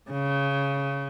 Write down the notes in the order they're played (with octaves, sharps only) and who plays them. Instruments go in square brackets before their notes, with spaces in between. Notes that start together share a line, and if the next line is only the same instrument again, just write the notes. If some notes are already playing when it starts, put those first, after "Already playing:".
[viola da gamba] C#3